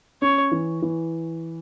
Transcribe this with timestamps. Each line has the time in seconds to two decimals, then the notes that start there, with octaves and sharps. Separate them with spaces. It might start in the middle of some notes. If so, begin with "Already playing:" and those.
0.22 C#4 C#5
0.52 E3
0.82 E3